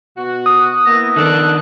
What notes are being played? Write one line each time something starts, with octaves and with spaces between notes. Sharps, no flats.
B2 F#4
D#6 F#6
A#3 B3 E4 A#6
D#3 B3 D4 A4 F#6